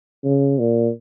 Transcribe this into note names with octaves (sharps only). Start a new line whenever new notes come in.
C#3
A#2